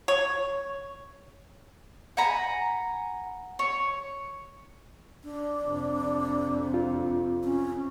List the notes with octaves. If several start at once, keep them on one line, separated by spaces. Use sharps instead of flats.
C#5
F#5 G#5 A#5 B5
C#5
D4
F2 C3
F4
C#4